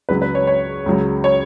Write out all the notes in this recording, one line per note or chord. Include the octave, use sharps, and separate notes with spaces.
C#2 C#3 F#3 B4
B4
C#5
C#5
C#2 C#3 F#3
C#5